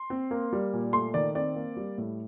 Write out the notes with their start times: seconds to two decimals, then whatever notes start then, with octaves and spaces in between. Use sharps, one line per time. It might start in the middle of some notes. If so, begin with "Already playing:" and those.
Already playing: C6
0.10 C4
0.31 A#3
0.53 G3
0.73 A#2
0.93 A3 C6
1.14 D#3 D5
1.35 C4 D5
1.56 A#3
1.77 G3
1.98 A2